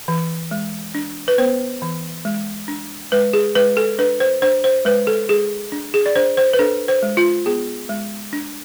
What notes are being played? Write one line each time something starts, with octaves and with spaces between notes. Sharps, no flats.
E3
G#3
D4
B4
B3 C5
E3
G#3
D4
G#3 B4
G#4
G#3 B4
A4
D4 B4
C5
D4 C5
C5
G#3 B4
A4
G#3 G#4
D4
G#4
D5
D4 C5
C5
B4
D4 A4
C5
G#3
F4
B3 G#4
G#3
D4